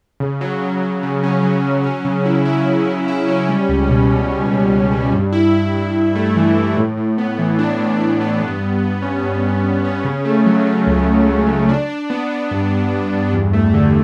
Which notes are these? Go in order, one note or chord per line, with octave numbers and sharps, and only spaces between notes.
C#3
F#3
C#3
F#3
C#3
C#4
F#3
F#3
C#4
C#3
E4
E4
C#3
C#3
E4
C#4
G3
C#2
B2
B2
C#2
B2
C#2
G3
G2
E4
E4
G2
G2
A3
E3
E3
A2
A2
B3
E3
D4
A2
D4
B3
G2
G2
G2
C#4
G2
G2
G2
C#4
C#3
A3
F#3
F#3
C#2
C#2
C#2
C#3
D4
D4
B3
B3
G2
G2
G2
G2
E2
A3
D3